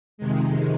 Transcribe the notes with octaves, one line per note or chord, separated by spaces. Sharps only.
F2 C3 D#3 G#3